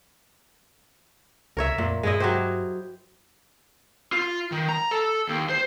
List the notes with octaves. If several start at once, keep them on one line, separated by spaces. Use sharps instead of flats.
C#2 A#4 C#5 E5
F2 A#2
G2 G#3 E4 D#5
F#3 G4 C5
F4
D#3
A#5
A4
D#2
C5